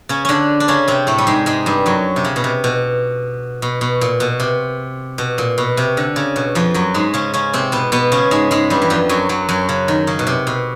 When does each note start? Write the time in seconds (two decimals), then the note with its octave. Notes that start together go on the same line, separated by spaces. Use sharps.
0.09 C#3 C#4
0.25 D3 C#4 D4
0.60 D4
0.68 C#3 C#4
0.88 C3 C4
1.07 A2 A3
1.18 G3
1.27 G#2 G#3
1.46 G#2 G#3
1.66 G2 G3
1.86 F#2 F#3
2.16 C3
2.25 C#3
2.36 B2
2.44 C3
2.64 B2
3.62 B2
3.81 B2
4.01 A#2
4.20 B2
4.40 C3
5.18 B2
5.38 A#2
5.58 B2
5.77 C3
5.97 D3
6.16 C#3
6.36 B2
6.55 F2 F3
6.74 F#2 F#3
6.94 G#2 G#3
7.14 C#3 C#4
7.34 C#3 C#4
7.53 C3 C4
7.72 B2 B3
7.92 B2 B3
8.12 C#3 C#4
8.31 G#2 G#3
8.51 G#2 G#3
8.70 G2 G3
8.82 E3
8.90 F2 F3
9.09 F#2 F#3
9.29 F#2 F#3
9.49 F#2 F#3
9.69 C#3
9.88 D#3
10.07 C#3
10.19 B2
10.27 C3
10.47 B2